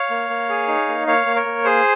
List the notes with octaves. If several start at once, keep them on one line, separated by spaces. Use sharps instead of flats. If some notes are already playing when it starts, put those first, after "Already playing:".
Already playing: C#5 F5
A#3
A#3
G#4
D#4
A#3
A#3 C#5 F5
A#3
A#4 C#5
A#3
G#4 C5